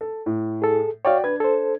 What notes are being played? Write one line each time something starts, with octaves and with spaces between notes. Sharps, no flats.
A4
A2
G#4 A4
F#4 C#5 D5 F5 G5
D4 B4 G#6
A4 C5